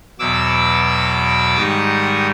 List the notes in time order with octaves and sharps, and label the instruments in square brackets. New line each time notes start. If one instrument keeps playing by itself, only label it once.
[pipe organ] E2 B2 F#3 D6 E6
G#2 D#3 G3 C#6 D#6